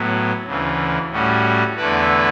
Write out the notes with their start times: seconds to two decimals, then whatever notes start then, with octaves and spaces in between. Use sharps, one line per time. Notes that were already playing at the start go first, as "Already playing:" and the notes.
Already playing: A2 F#3 B3
0.46 D2 C#3 E3
1.11 A2 G3 C#4 F#4
1.76 E2 D3 A3 E4 B4